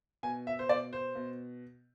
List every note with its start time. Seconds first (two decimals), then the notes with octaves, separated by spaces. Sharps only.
0.23 B2 G#5
0.47 E5
0.59 C5
0.69 B2 D5
0.93 C5
1.15 B2